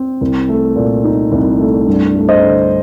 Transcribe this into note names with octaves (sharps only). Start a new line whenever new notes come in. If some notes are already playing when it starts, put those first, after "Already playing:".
Already playing: C4
C2
A3
A#2
D#4
C2
A3
G2
A3
C5 D#5
D3